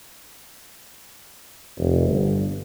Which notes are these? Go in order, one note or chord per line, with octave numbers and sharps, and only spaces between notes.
F1
G1